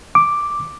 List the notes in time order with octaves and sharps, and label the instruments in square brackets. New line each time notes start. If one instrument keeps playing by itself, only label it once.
[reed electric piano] D6